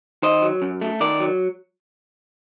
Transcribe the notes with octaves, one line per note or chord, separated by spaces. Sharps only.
D#3 C5 D#5
F#3
F#2
A3
D#3 A#4 D5
F#3